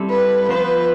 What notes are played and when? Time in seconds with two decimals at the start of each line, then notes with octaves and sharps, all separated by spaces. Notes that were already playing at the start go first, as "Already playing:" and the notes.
Already playing: G3 C4 E4 A4
0.10 B4
0.49 F3 B3 F4 B4 C5